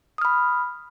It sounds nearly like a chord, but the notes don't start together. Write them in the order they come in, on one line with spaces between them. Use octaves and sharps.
D#6 F6 B5